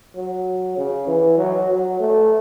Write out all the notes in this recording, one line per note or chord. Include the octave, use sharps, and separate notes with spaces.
F#3
C#3
E3
F#3
F#3
A3